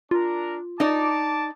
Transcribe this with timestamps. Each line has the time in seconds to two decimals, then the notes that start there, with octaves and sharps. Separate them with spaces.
0.11 D4 F4 A#4
0.80 D#4 D5 A5 D6